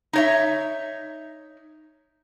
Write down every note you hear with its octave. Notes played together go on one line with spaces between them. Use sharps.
D#4 C#5 E5